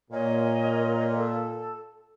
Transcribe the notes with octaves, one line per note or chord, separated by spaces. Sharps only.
A#2 A#4 C#5 D#5
A4